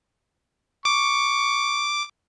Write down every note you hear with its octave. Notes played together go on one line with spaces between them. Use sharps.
C#6 D6